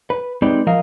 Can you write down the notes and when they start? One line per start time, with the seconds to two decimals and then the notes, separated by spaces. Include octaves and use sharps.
0.10 B4
0.42 G#3 C4 D#4 G4 B4 D5
0.67 F3 A#4 D#5 F5